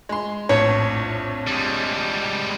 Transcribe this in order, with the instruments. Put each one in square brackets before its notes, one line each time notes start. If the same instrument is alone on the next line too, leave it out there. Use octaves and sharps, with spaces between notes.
[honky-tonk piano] G#3 C6
[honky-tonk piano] A#1 F2 A2 [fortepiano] C#5
[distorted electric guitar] G3 G#3